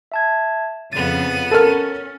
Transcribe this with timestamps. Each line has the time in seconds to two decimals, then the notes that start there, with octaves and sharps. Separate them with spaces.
0.12 E5 A5 G#6
0.93 F2 C#3 B3 A6 D#7
1.51 C#4 A4 A#4 F6 A6